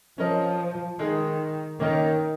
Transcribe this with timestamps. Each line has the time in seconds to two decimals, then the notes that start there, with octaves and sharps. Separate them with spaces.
0.18 F3 C#4 A#4 D#5
0.99 D#3 G#3 D#4 G#4
1.80 D#3 A#3 C#4 A#4 D#5